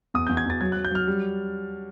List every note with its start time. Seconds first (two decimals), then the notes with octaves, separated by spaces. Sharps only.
0.14 E2 D#6
0.27 E2 G6
0.37 G#6
0.46 E2 A6
0.61 F#3 G#6
0.72 F#3 F#6
0.85 G6
0.91 F#3 F6
1.07 G3